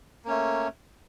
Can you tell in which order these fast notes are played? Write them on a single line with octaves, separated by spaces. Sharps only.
A#3 C#4 A3